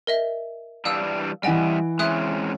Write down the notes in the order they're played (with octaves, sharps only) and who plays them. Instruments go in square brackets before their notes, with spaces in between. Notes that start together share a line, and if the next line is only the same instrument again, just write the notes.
[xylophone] A#4 D#5 E5
[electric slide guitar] E3 G3 D4 [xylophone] F5 D#6 E6
[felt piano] E3 F#5 D7 [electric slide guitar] G3 E5 [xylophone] D#5 G#5
[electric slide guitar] G#3 C4 C#4 [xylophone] E5 D#6 F#6